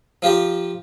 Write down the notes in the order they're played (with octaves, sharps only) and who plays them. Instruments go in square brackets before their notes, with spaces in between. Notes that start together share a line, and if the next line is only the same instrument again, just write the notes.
[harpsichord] F3 F4 G4 A#5